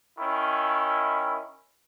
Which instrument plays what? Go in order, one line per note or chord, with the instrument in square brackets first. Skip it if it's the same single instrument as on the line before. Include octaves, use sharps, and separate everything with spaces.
[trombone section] D#3 C#4 E4